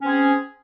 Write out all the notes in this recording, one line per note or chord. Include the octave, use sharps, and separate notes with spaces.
C4 C#4 G#4